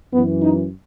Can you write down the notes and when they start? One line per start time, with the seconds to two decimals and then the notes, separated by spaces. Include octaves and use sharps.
0.13 F#2 E3 B3
0.43 D#4